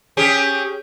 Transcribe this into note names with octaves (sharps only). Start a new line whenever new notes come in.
C#4 G4 G#4